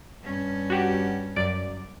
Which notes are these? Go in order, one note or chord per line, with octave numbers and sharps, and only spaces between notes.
G2 C#4
F#4 G4
F#2 D5 D7